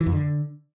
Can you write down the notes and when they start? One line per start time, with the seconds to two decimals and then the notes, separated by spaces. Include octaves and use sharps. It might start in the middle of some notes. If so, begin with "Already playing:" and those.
0.01 E3
0.06 F2
0.12 D3